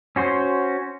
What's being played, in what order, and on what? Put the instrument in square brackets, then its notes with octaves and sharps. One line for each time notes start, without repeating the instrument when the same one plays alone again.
[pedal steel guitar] C#4 F#4 C5